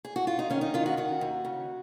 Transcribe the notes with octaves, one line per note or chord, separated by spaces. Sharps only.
G#4
F#4
F4
D#4
D#3 C#4
D#4
D#3 F4
F#4
D#3 F#4
D#2
C#3